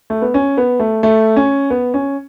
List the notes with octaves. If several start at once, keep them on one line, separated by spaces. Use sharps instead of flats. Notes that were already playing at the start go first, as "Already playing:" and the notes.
A3
B3
C#4
B3
A3
A3
C#4
B3
C#4